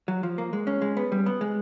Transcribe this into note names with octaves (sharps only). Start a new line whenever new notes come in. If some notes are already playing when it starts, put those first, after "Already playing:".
F#3
F3
A#3
G#3
C#4
G#3
B3
G3
B3
G#3